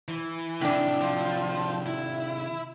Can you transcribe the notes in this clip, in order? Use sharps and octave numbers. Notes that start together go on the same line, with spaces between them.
E3
A2 C3 D#3 D4
F3
E4